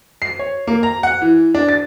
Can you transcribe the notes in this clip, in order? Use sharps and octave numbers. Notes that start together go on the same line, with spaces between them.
C7
C#5
A#3
A#5
F#5
E3
D4
A6